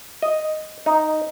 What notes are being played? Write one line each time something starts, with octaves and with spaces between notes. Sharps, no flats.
D#5
D#4